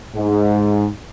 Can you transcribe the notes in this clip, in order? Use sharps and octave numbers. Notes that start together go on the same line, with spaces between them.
G#2